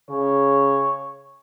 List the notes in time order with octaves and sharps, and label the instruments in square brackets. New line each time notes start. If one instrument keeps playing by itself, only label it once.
[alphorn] C#3 [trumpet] C#5